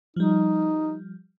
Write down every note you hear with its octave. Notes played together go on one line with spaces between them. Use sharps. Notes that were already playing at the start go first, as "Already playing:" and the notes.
F3 G3 D#4